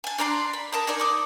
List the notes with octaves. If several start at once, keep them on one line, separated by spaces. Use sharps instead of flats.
G#5 A5
D4 D5 A#5 C6
B5
A#4 A5 D#6
D#4 A#4 D5 G#5
D6 D#6